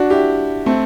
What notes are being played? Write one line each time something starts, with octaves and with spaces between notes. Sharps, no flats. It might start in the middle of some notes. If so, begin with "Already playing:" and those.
Already playing: D4 F#4
E4 G4
A3 C4